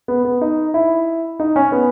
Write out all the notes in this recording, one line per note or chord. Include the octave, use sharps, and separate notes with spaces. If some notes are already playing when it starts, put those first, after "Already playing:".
B3
B3
D#4
E4
D#4
C#4
B3